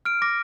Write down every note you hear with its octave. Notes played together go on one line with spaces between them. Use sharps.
F6 D7
D6 A#6